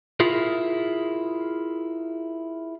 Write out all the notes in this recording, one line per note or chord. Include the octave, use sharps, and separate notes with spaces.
E4 F4 G#4 A#4